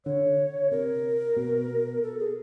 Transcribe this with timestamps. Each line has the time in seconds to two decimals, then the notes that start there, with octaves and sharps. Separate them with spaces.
0.06 D3 C#5
0.71 C3 A#4
1.36 B2
2.02 A4
2.19 G#4